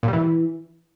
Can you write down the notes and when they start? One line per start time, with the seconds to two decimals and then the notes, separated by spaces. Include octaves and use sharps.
0.03 A#2
0.08 G3
0.13 E3